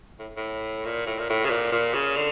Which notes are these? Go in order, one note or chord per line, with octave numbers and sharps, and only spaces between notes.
A2
A2
A#2
A2
A#2
A2
C#3
A#2
A#2
C#3
D3